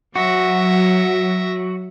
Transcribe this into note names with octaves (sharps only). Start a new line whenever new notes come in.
F#3 F#4 E5 A#6